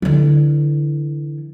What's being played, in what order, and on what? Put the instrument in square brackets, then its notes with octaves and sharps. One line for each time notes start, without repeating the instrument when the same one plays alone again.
[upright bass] D3 E3